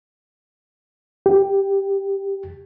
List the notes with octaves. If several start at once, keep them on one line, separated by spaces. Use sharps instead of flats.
G4